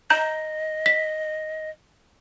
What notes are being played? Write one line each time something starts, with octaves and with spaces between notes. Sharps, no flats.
D#5 A#5 G6
B6